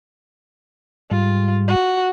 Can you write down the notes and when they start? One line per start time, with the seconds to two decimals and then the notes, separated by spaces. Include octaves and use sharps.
1.11 G#2 G3 F4
1.68 F#4